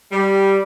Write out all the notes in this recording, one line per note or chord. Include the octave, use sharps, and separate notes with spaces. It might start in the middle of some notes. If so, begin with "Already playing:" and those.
G3